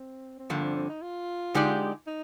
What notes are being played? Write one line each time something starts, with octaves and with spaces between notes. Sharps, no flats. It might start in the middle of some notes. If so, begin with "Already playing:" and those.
Already playing: C4
C4
G2 D3 F3 A#3
C4
C4
D#4
F4
D3 G#3 D#4 G4 D5
D#4